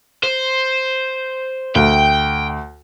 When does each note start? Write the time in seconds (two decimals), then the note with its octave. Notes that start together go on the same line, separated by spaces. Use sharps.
0.23 C5
1.76 D2 G5